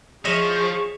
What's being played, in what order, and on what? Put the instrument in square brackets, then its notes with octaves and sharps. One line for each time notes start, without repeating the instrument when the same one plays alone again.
[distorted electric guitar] F3 [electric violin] G#4 C#6 [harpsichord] C#5 E5 B5 [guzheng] D#5